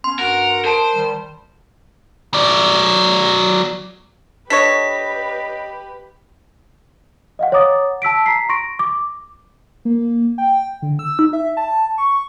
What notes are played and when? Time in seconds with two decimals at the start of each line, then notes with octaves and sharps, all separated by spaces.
0.04 B3 C#4 C6
0.19 G2 F#4 A#4 F#5
0.65 A#4 C5 A5
0.95 D#3 G3
2.34 F#3 D5
4.50 D4 G4 A4 B4 C#5 D#5 B6
7.39 D#5 F5 F#5
7.52 C#5 F#5 A#5 D6 D#6 A6
8.02 A5 E6 B6 D7
8.26 A#5 B6 C7
8.49 C6 C#6 A#6 D7
8.79 D6
9.85 A#3
10.38 G5
10.82 D3
10.99 E6
11.19 D#4
11.33 E5
11.57 A5
11.98 C#6